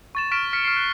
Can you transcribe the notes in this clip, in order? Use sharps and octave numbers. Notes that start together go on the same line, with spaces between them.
C#6 A6 E7
C#6 F6 B6 D7 E7
F6 B6 C#7
F6 C7
F#6